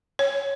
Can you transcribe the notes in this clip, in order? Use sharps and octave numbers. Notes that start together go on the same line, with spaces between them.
C#5